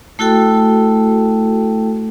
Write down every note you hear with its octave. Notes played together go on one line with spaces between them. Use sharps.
A3 E4 F#4 A4 G5